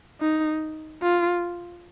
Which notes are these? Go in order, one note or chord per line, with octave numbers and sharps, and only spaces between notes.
D#4
F4